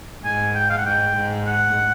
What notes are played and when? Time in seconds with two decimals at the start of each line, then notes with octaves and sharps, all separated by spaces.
0.24 G#2 G#5
0.55 G5
0.70 F5
0.78 F#5
0.85 G#2 G5
1.16 G#2
1.46 F#5